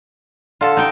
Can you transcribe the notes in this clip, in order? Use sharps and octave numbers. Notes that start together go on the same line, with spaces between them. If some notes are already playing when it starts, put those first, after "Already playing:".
D3 F4 A4
D#4 G5